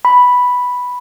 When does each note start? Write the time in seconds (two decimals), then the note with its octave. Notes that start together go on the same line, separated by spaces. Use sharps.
0.05 B5